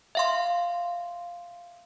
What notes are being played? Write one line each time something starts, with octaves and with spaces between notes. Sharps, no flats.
E5 F5 C6